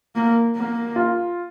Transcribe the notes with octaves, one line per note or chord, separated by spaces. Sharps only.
A#3
A#3
F4